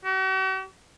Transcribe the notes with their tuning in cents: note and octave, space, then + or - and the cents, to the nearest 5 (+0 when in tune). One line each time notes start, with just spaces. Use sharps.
F#4 +45